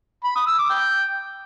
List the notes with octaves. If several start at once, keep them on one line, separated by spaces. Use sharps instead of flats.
B5
D#6
E6
D6
G5